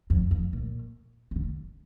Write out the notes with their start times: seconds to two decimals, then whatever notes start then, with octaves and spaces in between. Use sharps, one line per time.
0.10 F2
0.31 F2
0.53 A#2
1.31 C#3
1.36 D3